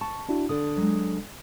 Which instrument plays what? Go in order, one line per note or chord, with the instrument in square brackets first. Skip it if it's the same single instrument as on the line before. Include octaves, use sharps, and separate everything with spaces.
[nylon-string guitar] A5 [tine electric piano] C#6
[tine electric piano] D4 E4 F#4
[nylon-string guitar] D3 [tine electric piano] D4 A4 D#6
[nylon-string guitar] F#3 G#3